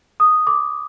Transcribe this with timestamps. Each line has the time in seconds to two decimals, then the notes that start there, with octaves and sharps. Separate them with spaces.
0.20 D#6
0.47 D6